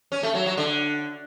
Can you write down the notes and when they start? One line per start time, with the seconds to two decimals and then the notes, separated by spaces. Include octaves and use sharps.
0.12 C#4
0.23 A3
0.35 F#3
0.46 F#3
0.57 D3